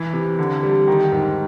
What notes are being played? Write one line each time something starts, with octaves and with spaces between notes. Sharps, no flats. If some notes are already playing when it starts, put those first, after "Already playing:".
Already playing: E3
C3
D3
G3
D#3
G#2